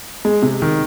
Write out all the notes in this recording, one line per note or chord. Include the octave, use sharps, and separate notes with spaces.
G#3
C3
D#3